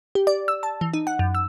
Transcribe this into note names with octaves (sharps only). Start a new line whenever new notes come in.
G4
D5
E6
A5
E3
D#4
F#5
F#2
E6